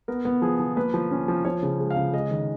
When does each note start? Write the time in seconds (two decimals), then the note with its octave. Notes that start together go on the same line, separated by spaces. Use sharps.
0.08 B3 A#4
0.25 B3
0.42 F3 G#4
0.60 F3
0.77 A#3 B4
0.94 F3
1.12 C#4
1.28 F3
1.45 F3 C#5
1.63 C#3
1.80 G#3
1.90 F5
1.97 C#3
2.13 G#3 D#5
2.31 D#3